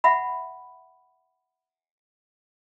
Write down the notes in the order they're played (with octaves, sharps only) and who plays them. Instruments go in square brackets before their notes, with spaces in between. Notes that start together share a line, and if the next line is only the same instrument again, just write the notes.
[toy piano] E5 F#5 B5